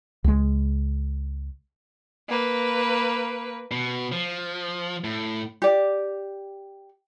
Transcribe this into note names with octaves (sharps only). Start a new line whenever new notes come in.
C#2 G#3
A#3 B4
B2
F3
A2
G4 D5